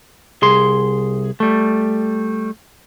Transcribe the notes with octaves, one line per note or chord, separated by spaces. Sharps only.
C2 G#4 C6
G3 A3